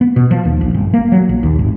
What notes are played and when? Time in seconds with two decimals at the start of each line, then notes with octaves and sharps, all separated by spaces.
0.01 B3
0.16 B2
0.31 F3
0.45 D#2
0.61 A#1
0.74 G1
0.94 A#3
1.12 F#3
1.29 A#1
1.43 D#2
1.59 G#1